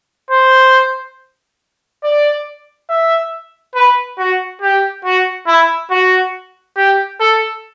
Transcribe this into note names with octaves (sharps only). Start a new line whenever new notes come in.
C5
D5
E5
B4
F#4
G4
F#4
E4
F#4
G4
A4